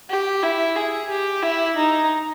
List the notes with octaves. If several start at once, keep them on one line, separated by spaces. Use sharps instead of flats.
G4
E4
G#4
G4
E4
D#4